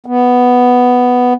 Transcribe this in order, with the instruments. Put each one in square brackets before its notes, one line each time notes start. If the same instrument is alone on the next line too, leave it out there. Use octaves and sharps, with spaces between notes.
[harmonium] B3